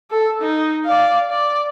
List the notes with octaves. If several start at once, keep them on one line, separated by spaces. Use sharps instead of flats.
A4
D#4
D5 F5
D5